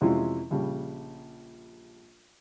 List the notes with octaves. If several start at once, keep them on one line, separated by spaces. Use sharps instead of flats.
F2 C3 E3 G#3 C#4 F4
A#1 C#3 G3